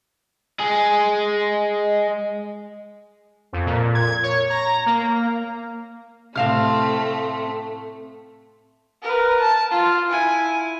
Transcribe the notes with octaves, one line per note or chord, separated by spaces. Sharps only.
G#3 G#4
F2
A#2
G#6
C#5
A#5
A#3
A2 C3 A3 C4 F5 F6
A#4 B4
A5
F4
E4 G#5